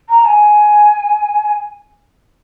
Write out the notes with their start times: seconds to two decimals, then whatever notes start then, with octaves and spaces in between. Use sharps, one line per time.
0.09 A#5
0.25 G#5